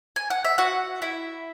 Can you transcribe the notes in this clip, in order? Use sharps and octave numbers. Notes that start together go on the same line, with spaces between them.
G#5
F#5
E5
F#4 F#5
E4 E5